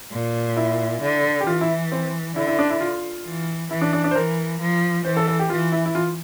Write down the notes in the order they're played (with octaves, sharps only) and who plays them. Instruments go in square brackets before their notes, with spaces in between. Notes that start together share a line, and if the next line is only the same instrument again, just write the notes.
[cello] A#2
[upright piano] E4
[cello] D3
[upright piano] G4
[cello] E3 [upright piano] F4
[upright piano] E4
C4
[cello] D3 [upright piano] E4
[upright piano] E4
D4
E4
F4
[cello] E3
[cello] E3 [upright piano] E4
[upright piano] D4
D4
D4
C5
[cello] E3 [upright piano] A#4
[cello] F3
[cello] E3 [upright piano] C5
[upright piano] A4
A4
G4
[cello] E3 [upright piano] F4
[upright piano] E4
E4
F4